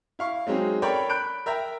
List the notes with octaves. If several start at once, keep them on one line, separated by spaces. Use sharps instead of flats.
E4 F5 C#6
F#3 G#3 C4 C#4 D#4
A4 A#4 C#5 D5 G5 B5
B5 F#6 G6 D7
A#4 E5 G5 A#5